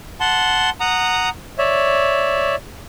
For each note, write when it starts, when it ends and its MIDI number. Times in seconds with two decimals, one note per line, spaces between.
0.21 0.70 78
0.21 0.70 81
0.21 0.70 84
0.80 1.29 78
0.80 1.29 82
0.80 1.29 87
1.58 2.55 73
1.58 2.55 74
1.58 2.55 76